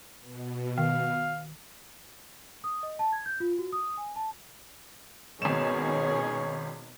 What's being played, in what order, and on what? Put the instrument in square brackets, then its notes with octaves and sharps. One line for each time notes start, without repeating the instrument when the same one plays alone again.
[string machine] B2
[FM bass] D#3 [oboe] F5
[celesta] D#6
D#5
A5
G#6
G6
F4
F#4
D#6
G#5
A5
[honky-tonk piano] G#1 E7 [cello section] B2 D#3 D#4 [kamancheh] C#4 G#4 [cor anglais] C#5